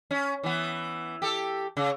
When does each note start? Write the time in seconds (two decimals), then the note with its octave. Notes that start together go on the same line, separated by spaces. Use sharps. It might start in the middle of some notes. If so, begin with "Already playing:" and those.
0.11 C#4
0.43 E3 B3
1.22 G4 A4
1.77 C#3